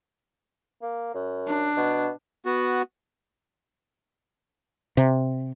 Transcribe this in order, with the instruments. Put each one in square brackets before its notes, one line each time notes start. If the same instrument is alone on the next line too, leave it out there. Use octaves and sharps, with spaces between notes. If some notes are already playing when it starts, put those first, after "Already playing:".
[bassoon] A#3
F#2
[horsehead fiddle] D4
[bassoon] B2
[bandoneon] B3 F#4
[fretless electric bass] C3